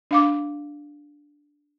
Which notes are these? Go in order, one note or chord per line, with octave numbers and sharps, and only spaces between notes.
D4 F5 D6